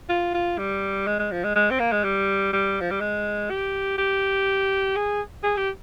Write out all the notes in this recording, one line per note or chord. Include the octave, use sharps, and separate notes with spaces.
F4
F4
G3
G#3
G#3
F3
G#3
G#3
C4
A#3
G#3
G3
G3
F3
G3
G#3
G4
G4
G#4
G#4
G4